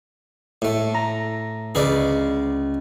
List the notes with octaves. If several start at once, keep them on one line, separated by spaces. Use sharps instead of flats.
A2 A3
A#5
C#2 G#4 B4 D5